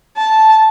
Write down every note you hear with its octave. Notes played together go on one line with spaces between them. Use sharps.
A5